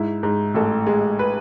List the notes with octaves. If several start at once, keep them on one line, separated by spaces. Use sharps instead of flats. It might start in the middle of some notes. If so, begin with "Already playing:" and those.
Already playing: G#2 E4
G#2
A1 A4
G#3
B4